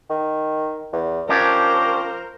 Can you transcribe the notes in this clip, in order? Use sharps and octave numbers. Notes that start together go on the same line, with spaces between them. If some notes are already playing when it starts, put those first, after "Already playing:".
D#3
E2
F3 C#4 D4 G4 A#4 C5